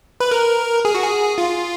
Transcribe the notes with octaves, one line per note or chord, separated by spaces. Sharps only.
B4
A#4
G#4
F#4
G#4
F4